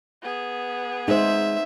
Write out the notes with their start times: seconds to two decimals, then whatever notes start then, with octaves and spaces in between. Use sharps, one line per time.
0.22 B3 G#4
1.08 G#3 D#4 C5 E5